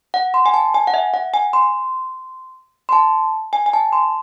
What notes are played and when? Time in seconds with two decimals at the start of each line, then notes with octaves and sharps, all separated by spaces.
0.14 F#5
0.34 C6
0.46 G#5
0.54 A5
0.74 G#5
0.87 F#5
0.94 E5
1.14 F#5
1.34 G#5
1.53 C6
2.89 C6
2.93 A5
3.53 G#5
3.66 G#5
3.73 A5
3.93 C6